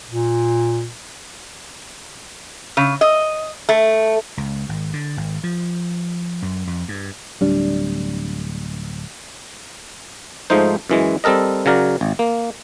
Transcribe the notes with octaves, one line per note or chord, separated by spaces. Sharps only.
A#2
C#3
D#5
A3
C#2
G#1
D3
G#1
F3
F#2
F2
G2
D1 G3 D4
G#2 F3 A3 D#4 C5
F#2 E3 G#3
G3 C4 A4 A#4 D#5
C#3 F#3 A#4 D5
G#1
A#3